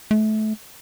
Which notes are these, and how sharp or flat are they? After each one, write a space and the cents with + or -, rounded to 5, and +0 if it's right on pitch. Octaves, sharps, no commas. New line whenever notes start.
A3 -25